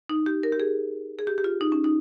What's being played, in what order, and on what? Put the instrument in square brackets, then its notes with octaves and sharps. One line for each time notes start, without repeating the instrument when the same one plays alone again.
[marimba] D#4
G4
A#4
G4
G#4
G#4
G4
G4
F4
D#4
C#4
D#4